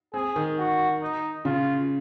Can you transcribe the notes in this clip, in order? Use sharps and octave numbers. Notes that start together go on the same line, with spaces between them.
C4 G#4
D#3
F#4
D#4
C#3 F4